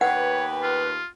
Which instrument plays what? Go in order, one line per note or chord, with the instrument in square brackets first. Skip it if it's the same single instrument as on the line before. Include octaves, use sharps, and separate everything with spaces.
[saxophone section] D#2 B3 B4 [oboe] C#5 [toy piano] F#5 [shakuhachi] G5
[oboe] F4